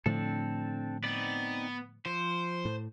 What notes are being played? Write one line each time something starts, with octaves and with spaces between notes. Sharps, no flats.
A2 D3 F3 C4 D4 A4
B3 C4 D#4 D5
F3 C5
A2